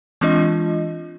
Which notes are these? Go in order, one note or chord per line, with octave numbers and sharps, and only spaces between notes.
E3 G#3 C4 D4 F4 D#5